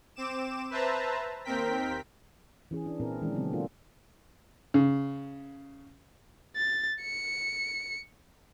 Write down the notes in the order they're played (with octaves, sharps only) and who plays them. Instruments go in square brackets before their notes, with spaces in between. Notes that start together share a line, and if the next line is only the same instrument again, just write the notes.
[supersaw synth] C4 D6 E7
B4 C5 E5 A5 A#5
D#2 C4 A#4 G5 B6
[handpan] E3 C#4 G#4
D4
A#2 C4 E4 G#4 A#4
D#3 E3 G#3 C#4 D4
C#3 F#3 B3 C4
A#3 D4 F4 A4
[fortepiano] C#3
[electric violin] A6
C#7